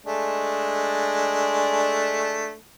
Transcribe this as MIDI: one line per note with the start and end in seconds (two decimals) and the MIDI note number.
0.06 2.55 56
0.06 2.55 57
0.06 2.55 62